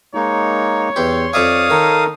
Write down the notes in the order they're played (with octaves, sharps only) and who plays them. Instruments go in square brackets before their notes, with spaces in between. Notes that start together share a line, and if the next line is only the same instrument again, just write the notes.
[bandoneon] G#3 A#3 D#4 [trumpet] C#5
[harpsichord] E2 G4 [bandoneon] C6
[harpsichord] F2 E5 G#5 [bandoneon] D5 [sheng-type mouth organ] F5 D#6
[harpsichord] D#3 [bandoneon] D#4 A4 A#4